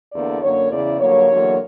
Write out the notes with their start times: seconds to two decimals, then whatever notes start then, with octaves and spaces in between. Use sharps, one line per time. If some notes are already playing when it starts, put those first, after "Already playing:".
0.12 E2 D3 A#3 D5
0.42 F#2 D3 A#3 C#5
0.70 E2 C#3 E3 D5
0.99 G2 D3 F#3 A#3 C#5
1.28 E2 D3 F#3 A#3